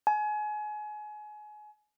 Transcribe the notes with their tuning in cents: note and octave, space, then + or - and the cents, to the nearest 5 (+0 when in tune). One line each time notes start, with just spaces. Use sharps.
G#5 +30